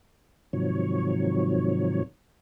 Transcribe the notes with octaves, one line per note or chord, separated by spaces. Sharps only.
G#2 C3 D#3 F3 F#3 C#5